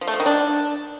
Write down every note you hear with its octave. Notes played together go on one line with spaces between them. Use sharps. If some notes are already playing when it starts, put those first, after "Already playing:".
F3
A3
F3
D#3
D4